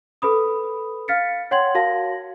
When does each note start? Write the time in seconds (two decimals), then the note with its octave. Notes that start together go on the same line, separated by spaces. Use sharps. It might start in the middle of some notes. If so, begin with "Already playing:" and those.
0.22 A4 B4 B5 D#6
1.08 F5 F6 A6 B6 C#7
1.51 C#5 F#5 G5 C6 G#6 F#7
1.75 F#4 A#4 F5 A5 A#6